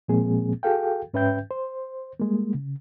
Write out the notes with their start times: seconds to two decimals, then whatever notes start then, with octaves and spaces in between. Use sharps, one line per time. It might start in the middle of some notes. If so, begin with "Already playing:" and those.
0.08 A#2 F3 G#3 A#3 C4 G#4
0.63 F#4 G#4 A4 F5 G5
1.14 G#2 C#4 B4 E5 G5 G6
1.51 C5
2.19 G3 G#3 A#3
2.54 C#3